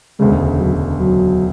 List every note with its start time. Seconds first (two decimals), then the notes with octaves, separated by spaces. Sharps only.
0.19 E1 D2 C#3 G#3
0.60 F#3
0.99 F#3